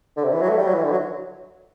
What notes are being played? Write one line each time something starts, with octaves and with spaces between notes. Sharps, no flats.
D3
C3
E3
F#3
A3
G3
F#3
E3
D3
F#3